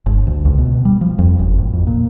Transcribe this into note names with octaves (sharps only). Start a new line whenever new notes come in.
G1
D2
C#2
B2
G3
F3
F2
F#1
A1
F2
A#2